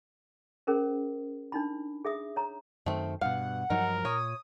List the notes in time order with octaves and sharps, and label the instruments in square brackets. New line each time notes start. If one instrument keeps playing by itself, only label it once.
[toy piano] C#4 G#4 A#4 C5
D4 D#4 B5
G#4 E5 D#6
C#5 A#5
[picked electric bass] F#2 D#3 [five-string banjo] A3 C4
[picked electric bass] G2 B2 [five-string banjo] F5 [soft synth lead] F#5
[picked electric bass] G2 F3 F#3 [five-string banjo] D#4 [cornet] A#4
[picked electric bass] A#2 [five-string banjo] C#5 [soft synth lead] D#6